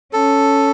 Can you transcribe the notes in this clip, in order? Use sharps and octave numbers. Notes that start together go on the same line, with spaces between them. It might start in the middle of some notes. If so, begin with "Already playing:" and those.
C#4 A4